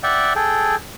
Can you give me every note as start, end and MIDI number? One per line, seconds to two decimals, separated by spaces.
0.03 0.33 74
0.03 0.33 76
0.03 0.33 78
0.03 0.33 79
0.36 0.76 68
0.36 0.76 69
0.36 0.76 79